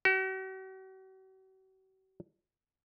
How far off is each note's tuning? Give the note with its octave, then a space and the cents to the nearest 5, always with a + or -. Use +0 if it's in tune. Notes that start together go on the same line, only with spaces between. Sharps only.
F#4 +45